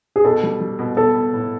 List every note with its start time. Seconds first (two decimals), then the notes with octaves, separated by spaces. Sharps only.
0.16 G#4
0.24 B2 A4
0.43 G3
0.61 G3
0.79 B2
0.97 B3 A4
1.14 B3
1.33 A2